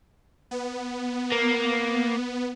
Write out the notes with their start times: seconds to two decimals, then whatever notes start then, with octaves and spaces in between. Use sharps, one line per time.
0.51 B3
1.32 A#3